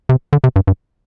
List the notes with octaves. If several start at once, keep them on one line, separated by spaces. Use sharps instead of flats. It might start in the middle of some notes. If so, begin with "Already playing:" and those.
C3
D3
C3
G2
G2